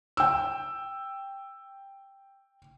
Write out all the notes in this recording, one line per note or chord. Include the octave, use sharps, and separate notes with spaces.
G5 E6